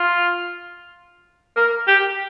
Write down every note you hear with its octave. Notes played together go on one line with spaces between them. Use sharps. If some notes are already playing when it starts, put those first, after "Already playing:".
Already playing: F4
A#4
G4